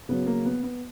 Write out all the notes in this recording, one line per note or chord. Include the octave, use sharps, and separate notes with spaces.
C#3 F#3 B3
A#3
B3
B3